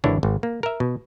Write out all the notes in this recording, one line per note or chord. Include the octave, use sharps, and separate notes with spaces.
G#1 D3 E3 D4 E4 C#5
G#1
A#3
A#4 E5
B2